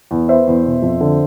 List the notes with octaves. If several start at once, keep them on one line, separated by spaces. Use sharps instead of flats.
E2
B3 C5 E5
E2
B2
F2
D3